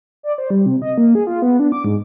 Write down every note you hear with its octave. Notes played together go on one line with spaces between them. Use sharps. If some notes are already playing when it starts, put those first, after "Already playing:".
D5
C5
G3
C3
D#5
A#3
G#4
F4
B3
D4
D6
G#2